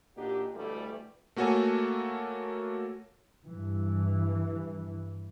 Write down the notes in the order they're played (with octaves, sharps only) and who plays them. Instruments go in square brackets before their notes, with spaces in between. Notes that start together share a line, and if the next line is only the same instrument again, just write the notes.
[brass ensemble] A#2 E3 D4 D#4 F#4 G4
D2 B2 E3 G3 A3
[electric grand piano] A3 A#3 F#4 A4 C#5 G#5
[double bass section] G2 E3